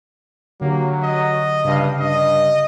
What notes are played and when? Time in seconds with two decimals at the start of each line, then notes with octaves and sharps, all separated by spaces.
0.61 D3 F#3 A#3 G4
1.03 D#5
1.65 G2 C#3 F5
2.01 G2 D#5